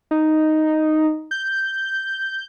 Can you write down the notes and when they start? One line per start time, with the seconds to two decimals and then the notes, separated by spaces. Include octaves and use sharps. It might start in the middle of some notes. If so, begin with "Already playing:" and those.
0.11 D#4
1.31 G6